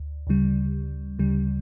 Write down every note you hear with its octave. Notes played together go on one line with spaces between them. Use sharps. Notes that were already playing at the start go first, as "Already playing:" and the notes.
Already playing: D2
D2 C#3 G3
D2 C#3 G3